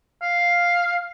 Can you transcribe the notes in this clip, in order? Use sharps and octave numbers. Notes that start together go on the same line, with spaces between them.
F5